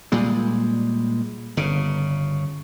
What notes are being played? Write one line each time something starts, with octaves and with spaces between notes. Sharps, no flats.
A#2 G3 G#3
G1 C#3